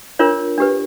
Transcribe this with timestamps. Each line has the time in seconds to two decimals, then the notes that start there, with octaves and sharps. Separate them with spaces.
0.19 D4 F4 A#4 C#5
0.58 D4 G4 B4